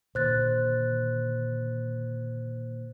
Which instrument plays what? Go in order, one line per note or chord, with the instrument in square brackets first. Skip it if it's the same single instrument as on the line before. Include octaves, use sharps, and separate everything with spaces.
[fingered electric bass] A#2 D3 D#3 [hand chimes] C5 F#6 A6